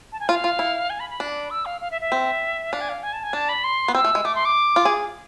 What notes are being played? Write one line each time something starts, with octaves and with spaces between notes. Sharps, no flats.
A5
G#5
F4 F5
F4
E4
G#5
B5
B5
D4
E6
F5
F5
E5
E5
C4
D4 F5
G#5
F5
G#5
A5
G#5
D4 A5
B5
C6
B3
C4 E6
A3
G#3
A3 D6
C6
D6
F4
G#4